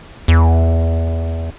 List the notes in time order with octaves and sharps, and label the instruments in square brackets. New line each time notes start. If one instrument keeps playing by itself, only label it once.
[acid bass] E2